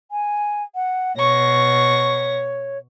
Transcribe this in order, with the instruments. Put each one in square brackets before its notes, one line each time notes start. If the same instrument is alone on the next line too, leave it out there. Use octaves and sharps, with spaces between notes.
[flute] G#5
F#5
[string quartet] B2 C#6 A#6 [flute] C#5